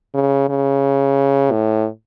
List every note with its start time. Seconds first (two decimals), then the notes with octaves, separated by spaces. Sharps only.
0.15 C#3
0.49 C#3
1.51 A2